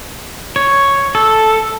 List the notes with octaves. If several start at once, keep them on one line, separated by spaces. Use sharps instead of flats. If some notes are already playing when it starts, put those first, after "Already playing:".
C#5
A4